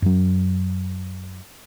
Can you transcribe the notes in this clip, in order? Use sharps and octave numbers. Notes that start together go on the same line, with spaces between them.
F#2 F#3